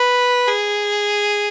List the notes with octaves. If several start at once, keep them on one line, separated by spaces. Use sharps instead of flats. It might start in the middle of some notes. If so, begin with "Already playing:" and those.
Already playing: B4
G#4